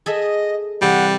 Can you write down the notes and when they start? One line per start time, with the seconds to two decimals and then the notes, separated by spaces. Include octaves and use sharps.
0.06 G#4 A4 D#5 E5
0.82 C3 E3 G3 F#5